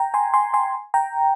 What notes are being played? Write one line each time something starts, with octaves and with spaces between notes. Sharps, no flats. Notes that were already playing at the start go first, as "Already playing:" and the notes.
Already playing: G5 A#5
G#5 C6
G#5 C6
G#5 C6
G5 A#5